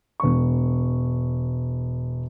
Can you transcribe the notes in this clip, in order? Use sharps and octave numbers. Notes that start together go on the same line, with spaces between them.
E1 C#6